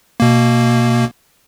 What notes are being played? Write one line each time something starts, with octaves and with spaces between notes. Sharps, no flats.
B2 A#3